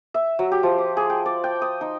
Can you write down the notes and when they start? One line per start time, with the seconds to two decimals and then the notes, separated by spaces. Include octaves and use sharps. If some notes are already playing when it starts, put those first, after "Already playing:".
0.14 E5
0.39 F#3
0.52 G4
0.63 F3
0.78 D6
0.97 G#4
1.10 G5
1.26 D5
1.44 G5
1.62 D#6
1.81 D#4